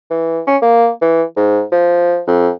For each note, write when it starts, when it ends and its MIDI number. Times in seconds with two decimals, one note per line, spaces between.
0.11 0.41 52
0.47 0.57 61
0.62 0.90 58
1.01 1.23 52
1.37 1.62 44
1.72 2.20 53
2.27 2.50 41